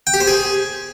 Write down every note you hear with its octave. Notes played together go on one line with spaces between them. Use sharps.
G5
G4
C5
G#4